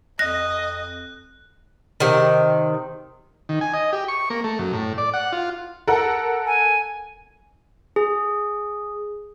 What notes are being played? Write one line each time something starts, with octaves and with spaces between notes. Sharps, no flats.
F2 D#5 F#6 A#6
C3 D#3
D#3
G#5
D#5
G4
C#6
A#3
A3
F#2
A2
D5
F#5
F4
A4 A#4 F#5
G#5
G#4